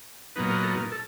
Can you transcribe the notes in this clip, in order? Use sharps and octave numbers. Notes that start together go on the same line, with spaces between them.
A#2 F#3 B3 D#4 B4
A#4
A4
A#4
A4